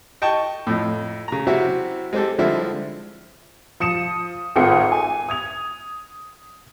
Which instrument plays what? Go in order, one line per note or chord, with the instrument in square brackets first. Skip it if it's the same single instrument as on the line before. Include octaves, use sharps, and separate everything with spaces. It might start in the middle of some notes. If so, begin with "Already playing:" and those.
[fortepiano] D#5 G5 A5 C#6
F2 A2
C#3 A#5
C3 F#3 C4 E4 F#4
G#3 C4 G4 A4
D3 F3 G3 G#3 C4 E4
[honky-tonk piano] F3 D#6 C#7 E7
G#1 A2 C4 F4 G#4 C#7
G#5
D#6 G#6 F7